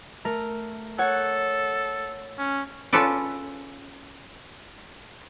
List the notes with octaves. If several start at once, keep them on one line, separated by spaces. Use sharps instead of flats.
A3 A#4
A4 C#5 F#5 F#6
C#4
C#4 F4 G#4 A4 B4 D5